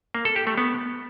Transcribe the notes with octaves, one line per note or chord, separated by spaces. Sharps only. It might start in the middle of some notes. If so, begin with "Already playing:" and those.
A#3
A4
G4
A3
B3